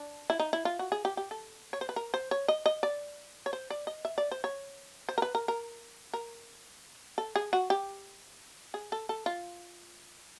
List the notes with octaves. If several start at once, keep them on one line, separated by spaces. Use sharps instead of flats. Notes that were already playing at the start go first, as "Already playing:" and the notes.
Already playing: D4
E4
D#4
E4
F4
F#4
G#4
G4
G4
A4
C#5
C5
B4
A#4
C5
C#5
D#5
D#5
D5
C#5
C5
D5
D#5
E5
D5
C5
C#5
C5
A#4
B4
A#4
A#4
A#4
A4
G#4
F#4
G4
G#4
A4
A4
F4